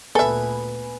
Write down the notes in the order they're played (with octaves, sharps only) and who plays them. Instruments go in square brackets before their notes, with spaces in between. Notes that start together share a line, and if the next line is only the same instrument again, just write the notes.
[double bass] D2 A#2 [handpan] B3 B4 [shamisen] A4 E5 [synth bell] G#5